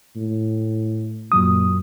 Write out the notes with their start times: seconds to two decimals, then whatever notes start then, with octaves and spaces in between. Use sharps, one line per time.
0.16 A2
1.32 F#2 A#2 F#3 D#6